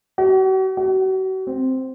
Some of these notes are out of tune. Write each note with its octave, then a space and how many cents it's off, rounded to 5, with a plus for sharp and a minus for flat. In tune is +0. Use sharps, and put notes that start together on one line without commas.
F#4 +40
F#4 +35
C4 +0